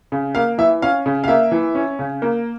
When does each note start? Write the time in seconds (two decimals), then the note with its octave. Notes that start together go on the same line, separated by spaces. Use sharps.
0.12 C#3
0.35 A#3 F5
0.58 E3 E5
0.82 C#4 F5
1.06 C#3
1.24 F5
1.28 A#3 E5
1.52 E3
1.75 C#4
1.99 C#3
2.22 A#3